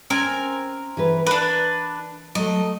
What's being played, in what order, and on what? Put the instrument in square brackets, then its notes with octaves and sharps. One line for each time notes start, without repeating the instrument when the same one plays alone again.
[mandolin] C4 A#4 G#5 [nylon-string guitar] C#4
[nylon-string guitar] E3 G#4 B4
[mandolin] D4 B4 [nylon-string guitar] A#4
[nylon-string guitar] F#3 A3 [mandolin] D#5